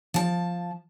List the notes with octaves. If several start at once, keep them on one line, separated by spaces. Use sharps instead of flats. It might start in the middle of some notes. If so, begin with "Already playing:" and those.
F3 A5